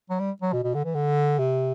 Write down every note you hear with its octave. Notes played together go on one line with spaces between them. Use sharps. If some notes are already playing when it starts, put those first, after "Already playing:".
F#3
G3
F#3
B2
B2
D3
E3
D3
C3